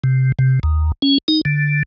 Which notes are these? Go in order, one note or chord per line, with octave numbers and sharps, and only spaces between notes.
C3
C3
D#2
C#4
D#4
D3